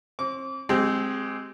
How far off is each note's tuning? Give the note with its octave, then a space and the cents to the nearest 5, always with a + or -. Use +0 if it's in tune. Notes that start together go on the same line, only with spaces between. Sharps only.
C4 +35 D6 -30
G#3 +0 C4 +0 G4 -25